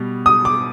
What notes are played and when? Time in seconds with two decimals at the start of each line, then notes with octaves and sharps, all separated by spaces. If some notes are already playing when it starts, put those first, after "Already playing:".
Already playing: B2 G3 B3
0.26 D#6
0.45 D6